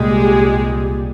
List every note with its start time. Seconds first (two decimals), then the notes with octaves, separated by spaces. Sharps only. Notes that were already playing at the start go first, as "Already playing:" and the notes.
Already playing: C2 A#2 G3 G#3 G#4